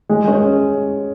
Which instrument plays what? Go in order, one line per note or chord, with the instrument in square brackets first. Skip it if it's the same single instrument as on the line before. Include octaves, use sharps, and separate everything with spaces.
[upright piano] G#3
C#4